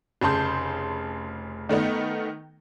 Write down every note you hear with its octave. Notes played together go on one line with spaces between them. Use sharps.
F1 C#3 A5 C6 G6
D#3 A3 B3 D#4